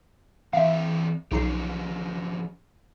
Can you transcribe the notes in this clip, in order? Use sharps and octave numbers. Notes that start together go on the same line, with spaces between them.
E3 C4 E5 F5 G5
B1 F3 C#4 D#4 G4 C7